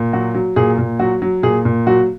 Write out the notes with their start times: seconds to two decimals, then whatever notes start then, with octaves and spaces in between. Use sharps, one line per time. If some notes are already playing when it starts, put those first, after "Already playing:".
Already playing: A#2
0.13 F#3 F#4
0.34 F#3
0.56 A#2 G#4
0.78 A#2
0.99 F#3 F#4
1.22 F#3
1.43 A#2 G#4
1.65 A#2
1.87 F#3 F#4